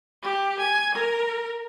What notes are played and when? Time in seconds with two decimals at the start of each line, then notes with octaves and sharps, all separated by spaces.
0.23 G4
0.59 G#5
0.94 A#4